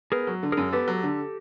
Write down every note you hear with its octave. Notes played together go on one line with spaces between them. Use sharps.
B3 G#4 A#4
F#3
D3
F#2 G#4 A#4
B3 G4 A4
F#3
D3